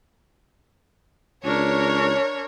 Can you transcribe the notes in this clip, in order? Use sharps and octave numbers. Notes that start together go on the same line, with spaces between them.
C#2 D4 A#4 C#5